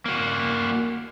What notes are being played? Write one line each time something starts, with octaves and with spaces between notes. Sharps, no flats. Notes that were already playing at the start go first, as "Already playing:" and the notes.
A#3 F#4